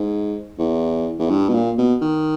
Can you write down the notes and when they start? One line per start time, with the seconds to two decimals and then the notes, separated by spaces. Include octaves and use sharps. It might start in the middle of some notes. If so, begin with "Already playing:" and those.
Already playing: G#2
0.59 E2
1.19 E2
1.30 G2
1.49 B2
1.54 A#2
1.78 B2
2.01 D#3